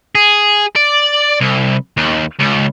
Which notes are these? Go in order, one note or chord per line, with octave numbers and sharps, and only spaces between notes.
G#4
D5
C2
D#2
C#2